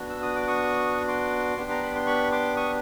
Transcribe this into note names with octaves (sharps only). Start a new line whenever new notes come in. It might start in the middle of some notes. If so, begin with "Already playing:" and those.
Already playing: B3 D4 F#4
E6
D#6
D6
C#6 D#6
C6 D6
B3 D4 G4
A#5
B5
C6
B5 C#6
C6 D6
C#6 D#6